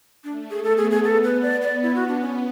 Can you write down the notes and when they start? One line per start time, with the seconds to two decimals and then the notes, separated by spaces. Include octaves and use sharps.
0.24 A3 D4
0.51 G#4
0.64 B3 A4
0.78 G#4
0.91 G#4
1.03 B3 A4
1.24 B4
1.42 D5
1.62 D5
1.83 E4
1.95 F#4
2.08 D4
2.21 C#4